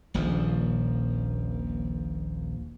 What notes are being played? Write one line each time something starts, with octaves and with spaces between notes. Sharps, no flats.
D#1 A#1 F3